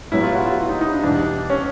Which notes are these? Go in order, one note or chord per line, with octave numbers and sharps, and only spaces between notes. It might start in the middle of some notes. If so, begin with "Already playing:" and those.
A2 F#3 B3 E4
F4
F#4
F4
E4
D#4
D#4
D4
E2 B2 G3 D4
C#4